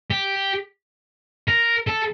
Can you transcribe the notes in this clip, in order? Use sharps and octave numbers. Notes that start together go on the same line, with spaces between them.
G4
A#4
A4